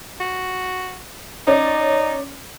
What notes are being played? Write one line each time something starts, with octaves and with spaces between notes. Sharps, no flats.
F#4
C#4 D#4 D5